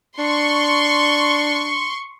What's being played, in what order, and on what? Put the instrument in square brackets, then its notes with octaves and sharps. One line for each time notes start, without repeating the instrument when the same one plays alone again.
[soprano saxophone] D4 [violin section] C6 C#6